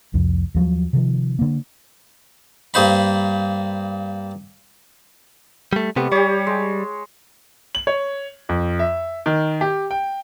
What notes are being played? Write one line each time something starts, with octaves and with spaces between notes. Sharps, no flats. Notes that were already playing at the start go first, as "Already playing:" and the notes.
C2 F2
D#2 F3 F#3
C3 D#3 F3
D3 A#3
G2 A#3 C5 B5
G3 A3
C3 G3 A3 B3
G3 G4 C#5
G#3
F#7
C#5
F2
E5
D#3
G4
G5